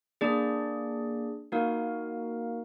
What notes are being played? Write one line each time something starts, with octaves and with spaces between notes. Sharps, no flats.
A#3 D4 G#4 D5
A#3 D#4 F#4 A#4 F5